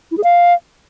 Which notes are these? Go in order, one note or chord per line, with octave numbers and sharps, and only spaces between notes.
E4
G#4
F5